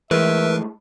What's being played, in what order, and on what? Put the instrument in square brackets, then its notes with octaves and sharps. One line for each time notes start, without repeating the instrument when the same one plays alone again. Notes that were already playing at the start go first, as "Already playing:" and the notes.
[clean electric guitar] A2 G#3 [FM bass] E3 [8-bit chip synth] A#4 B4 [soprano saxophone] E5